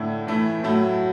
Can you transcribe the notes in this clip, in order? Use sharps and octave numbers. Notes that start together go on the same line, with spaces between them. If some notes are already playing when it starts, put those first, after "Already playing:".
Already playing: A2 D3 A3 E4
A2 E3 A3 E4
A2 F#3 A3 E4